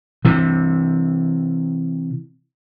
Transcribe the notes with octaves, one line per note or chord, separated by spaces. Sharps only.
C3 E3